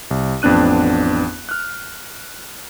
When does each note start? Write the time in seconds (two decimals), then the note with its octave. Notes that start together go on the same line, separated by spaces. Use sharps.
0.11 C2
0.42 A1 F2 B3 D4 F#6 D#7
1.49 F6 F#6